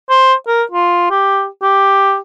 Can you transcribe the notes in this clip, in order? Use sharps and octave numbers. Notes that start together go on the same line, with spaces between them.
C5
A#4
F4
G4
G4